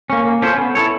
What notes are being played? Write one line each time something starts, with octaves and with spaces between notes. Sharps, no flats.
A#3 C#4
A#3
C#4 F4 A4 C5
B3
E4 A4 C#5